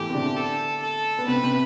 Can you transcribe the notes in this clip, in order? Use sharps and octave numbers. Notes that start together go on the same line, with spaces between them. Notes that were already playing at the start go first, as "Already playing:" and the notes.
Already playing: A2 E3 A3 E4 G4
C4
D3 D4
A4
A4
B3
C3 C4 B4
C3 C4